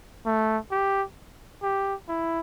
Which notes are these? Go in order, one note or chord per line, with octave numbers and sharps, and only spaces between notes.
A3
G4
G4
E4